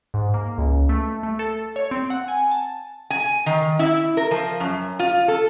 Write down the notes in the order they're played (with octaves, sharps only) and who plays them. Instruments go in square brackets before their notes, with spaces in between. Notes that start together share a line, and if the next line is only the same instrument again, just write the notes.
[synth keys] G#2
A#3
C#2
A3
A3
A4
C#5
C4
F#5
G#5
A5
[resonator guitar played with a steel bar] G#5
D#3
E4
A#4
F3
F#2
F4
A4